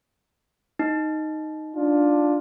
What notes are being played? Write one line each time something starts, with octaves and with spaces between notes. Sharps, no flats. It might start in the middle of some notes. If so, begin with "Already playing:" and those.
D#4
D4 F4